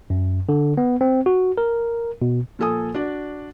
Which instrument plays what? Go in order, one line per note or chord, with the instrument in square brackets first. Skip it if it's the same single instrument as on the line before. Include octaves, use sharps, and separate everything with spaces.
[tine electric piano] F#2
D3
B3
C4
F#4
A#4
B2
[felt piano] A#2 F3 A4 G#5 D#6
D4 F#4 D5